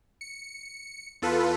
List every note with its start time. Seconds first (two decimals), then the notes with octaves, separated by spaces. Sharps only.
0.21 C#7
1.22 E2 F4 A4 B4